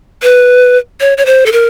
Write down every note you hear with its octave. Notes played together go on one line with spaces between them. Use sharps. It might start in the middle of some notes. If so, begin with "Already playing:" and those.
B4
C#5
C#5
C5
A4
A#4